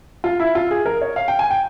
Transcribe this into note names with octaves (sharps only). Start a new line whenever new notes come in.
F4
E4
F4
G#4
A#4
C#5
F5
G5
G#5
G5